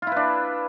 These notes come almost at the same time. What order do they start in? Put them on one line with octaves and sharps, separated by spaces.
F4 E4 B4 D4